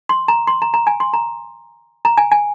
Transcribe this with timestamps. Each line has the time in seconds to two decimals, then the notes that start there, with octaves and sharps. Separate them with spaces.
0.09 C6
0.28 A#5
0.47 C6
0.62 A#5
0.74 A#5
0.87 G#5
1.00 C6
1.13 A#5
2.05 A#5
2.18 G#5
2.32 G#5